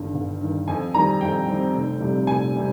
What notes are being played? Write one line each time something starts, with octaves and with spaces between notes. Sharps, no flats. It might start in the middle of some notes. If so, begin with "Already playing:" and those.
Already playing: G1 G2 D#3
G1
G2 D#3
F2 G#5
D#3 G3 C4 A#5
F2 G5
D#3 G3 C4
F1
F2 C3 G3
F1 G#5
C3 G3